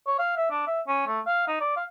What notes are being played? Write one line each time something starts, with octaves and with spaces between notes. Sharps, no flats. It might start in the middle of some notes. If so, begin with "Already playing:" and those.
C#5
F5
E5
D4
E5
C#4
A3
F5
D#4
D5
F5